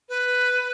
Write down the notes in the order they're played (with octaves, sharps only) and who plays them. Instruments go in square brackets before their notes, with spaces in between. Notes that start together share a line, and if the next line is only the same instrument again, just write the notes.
[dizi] B4